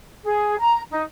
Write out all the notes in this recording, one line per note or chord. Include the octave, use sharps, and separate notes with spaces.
G#4
A#5
D#4